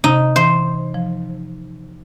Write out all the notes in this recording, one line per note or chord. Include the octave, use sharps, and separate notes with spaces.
C3 D#4
E3 C5
F3